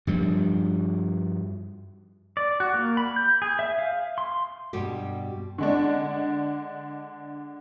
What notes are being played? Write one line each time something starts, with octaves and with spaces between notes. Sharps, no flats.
G2 F3 G3
D5
F#4
A#3
B5
G6
G#4
E5
F5
C6
G2 B2 G3 G4
D3 G#3 D4